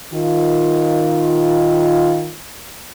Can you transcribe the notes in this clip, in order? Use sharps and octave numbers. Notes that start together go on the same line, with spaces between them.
D#3 F4